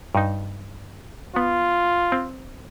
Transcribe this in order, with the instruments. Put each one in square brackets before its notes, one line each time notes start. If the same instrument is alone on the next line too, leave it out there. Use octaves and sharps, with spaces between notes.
[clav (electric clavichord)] G2 D#4
[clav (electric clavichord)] B3 [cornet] F4
[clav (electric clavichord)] C4